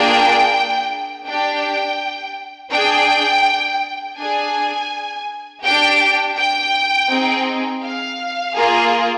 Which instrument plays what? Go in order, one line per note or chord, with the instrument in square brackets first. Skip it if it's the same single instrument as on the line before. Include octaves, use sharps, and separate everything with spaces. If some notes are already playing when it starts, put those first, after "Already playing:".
Already playing: [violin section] A#3 D4 F4 G#4 G5
D4 G4 G5
D4 G#4 G5
D4 G#4 G#5
D4 G4 G5
G5
C4 D#4 G#4
F5
A#3 F4 G#4